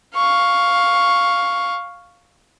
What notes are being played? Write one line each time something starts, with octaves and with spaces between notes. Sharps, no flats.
F5 C#6